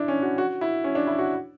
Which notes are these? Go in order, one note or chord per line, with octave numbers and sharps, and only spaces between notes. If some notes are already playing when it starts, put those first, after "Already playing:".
Already playing: D4 E4
C#4
F#4
F#4
E4
C#4
D4
E4
F#4